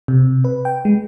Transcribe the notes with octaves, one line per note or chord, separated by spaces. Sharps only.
C3
B4
G5
G#3